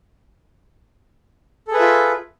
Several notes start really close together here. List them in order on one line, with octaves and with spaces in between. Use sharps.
A4 G#4 B4 E5 F4